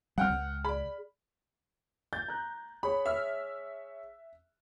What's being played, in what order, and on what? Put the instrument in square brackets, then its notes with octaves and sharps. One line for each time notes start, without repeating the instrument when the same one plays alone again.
[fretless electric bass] G3 C4 [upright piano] F#5 G5 F6
[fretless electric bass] C#2
[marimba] G#4 D5 [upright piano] B5
[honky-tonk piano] G6 [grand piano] A6
[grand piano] A#5 F#6
[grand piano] G#4 C#5 [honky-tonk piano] B5
[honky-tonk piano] E5 F6